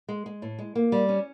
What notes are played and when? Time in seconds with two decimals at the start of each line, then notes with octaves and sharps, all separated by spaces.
0.08 G#3
0.26 G#3
0.42 A2
0.59 G#3
0.75 A#3
0.92 G3
1.09 C#4